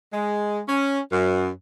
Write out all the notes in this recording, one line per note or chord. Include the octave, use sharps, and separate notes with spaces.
G#3
C#4
F#2